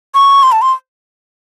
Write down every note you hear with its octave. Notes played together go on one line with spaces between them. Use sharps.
C#6
C6
A5
C6